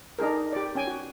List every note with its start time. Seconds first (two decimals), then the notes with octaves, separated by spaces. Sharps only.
0.19 D4 D#4 G#4 A#4
0.53 G4 D5
0.75 C#4 G5 G#5
0.87 F#4